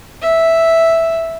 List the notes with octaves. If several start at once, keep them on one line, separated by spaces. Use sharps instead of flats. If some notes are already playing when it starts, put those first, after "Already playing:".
E5